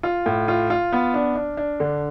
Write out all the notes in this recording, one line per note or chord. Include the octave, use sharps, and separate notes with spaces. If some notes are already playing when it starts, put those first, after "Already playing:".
F4
A2
F4
F4
B3
D4
D4
D4
D3